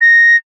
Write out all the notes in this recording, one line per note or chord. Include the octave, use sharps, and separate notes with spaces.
A#6